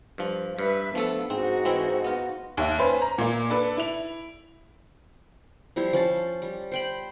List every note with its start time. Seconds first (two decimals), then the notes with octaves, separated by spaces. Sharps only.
0.18 G2 F3
0.59 G2 B4 E5
0.95 F3 A3 B3 D4 A4
1.30 G#2 C4 D#4 F#4
1.65 E3 C4 E4
2.04 B3 F4
2.57 D#2 E5
2.78 C#4 B4 C5
3.02 A#5
3.18 A#2 A#3
3.50 D4 A4 B4
3.77 E4 F7
5.76 F3 G3 E4 C5
5.93 F3 C#4 A5
6.42 G3
6.72 C5 G5 B5